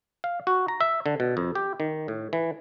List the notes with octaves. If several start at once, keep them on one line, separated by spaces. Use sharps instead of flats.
F5
F#4
A#5
E5
D3
B2
F2
G4
D#3
A2
E3